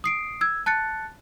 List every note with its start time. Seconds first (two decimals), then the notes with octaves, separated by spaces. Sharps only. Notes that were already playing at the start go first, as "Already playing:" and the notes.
0.04 D#6 C7 D7
0.41 E6 G#6
0.66 A5 F#6 A6 C#7